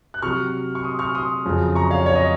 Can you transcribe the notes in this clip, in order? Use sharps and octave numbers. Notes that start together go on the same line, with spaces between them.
F#6
C3 F#3 C#6 F6
C#6
C6 D#6
C#6 F6
C6 D#6
F2 C#3 F#3
A#5 C#6
C#5 F5
C#5
D#5